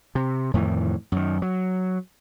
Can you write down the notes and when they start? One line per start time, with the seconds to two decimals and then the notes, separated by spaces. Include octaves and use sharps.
0.15 C3
0.54 F2 A2 D#3 E3
1.12 F#2 D#3
1.42 F#3